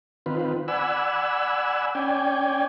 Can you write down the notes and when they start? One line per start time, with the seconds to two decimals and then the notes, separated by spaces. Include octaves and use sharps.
0.26 D#3 C4 F4 B4
0.68 D5 F#5 G#5 B5 E6
1.95 C#4 D5 G5 G#5